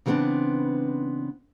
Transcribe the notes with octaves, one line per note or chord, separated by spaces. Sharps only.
C#3 E3 G3 B3 C4 D4